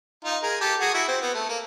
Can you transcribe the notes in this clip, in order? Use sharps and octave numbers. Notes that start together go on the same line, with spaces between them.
D#4 F4
G#4 A#4
G4 A4
F#4 G#4
E4 F#4
C4
B3
A3
A#3